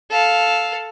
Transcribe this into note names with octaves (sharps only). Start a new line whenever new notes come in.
A4 F5